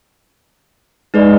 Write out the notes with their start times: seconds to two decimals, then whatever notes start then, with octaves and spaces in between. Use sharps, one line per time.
1.14 G#3 D#4 B4 D5